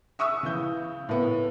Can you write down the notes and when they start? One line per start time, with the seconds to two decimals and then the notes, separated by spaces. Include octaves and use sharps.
0.19 E5 C#6 D#6 E6
0.43 C#3 E3 G6
1.09 A2 B3